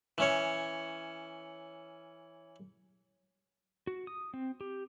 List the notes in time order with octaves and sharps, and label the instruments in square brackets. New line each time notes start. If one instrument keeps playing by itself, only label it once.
[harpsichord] E3 C#4 C#5
[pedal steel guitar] F#4
D#6
C4
G4